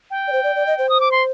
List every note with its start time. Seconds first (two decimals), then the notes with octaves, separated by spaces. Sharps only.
0.11 G5
0.28 D5
0.32 C5
0.44 D5
0.56 D5
0.67 D#5
0.79 C5
0.89 D#6
1.00 D6
1.11 C6